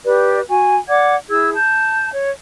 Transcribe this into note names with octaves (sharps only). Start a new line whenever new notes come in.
G4 B4 D5
F#4 G#5
D5 F#5 D6 G#6
E4 G#4 E6 G#6
A5 G6
C#5